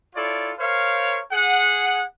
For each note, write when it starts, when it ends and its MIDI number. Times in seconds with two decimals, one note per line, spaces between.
0.16 0.53 64
0.16 0.53 65
0.16 0.53 69
0.16 0.53 73
0.16 0.53 74
0.59 1.21 70
0.59 1.21 72
0.59 1.21 73
0.59 1.21 77
1.31 2.04 68
1.31 2.04 78